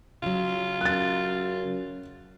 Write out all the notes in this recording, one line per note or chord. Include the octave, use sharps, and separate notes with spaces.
C#3 F#3 F4
F#2 F#6 A6